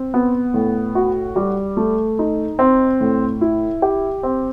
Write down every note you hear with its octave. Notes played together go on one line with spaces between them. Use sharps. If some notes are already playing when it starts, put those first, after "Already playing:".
Already playing: C4
B3
A2
F#4
G3
A3
D#4
C4
A2
E4
G4
C4